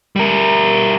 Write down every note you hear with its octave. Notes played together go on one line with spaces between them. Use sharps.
G3 A#4